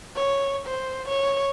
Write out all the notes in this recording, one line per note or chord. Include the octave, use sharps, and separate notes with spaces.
C#5
C5
C#5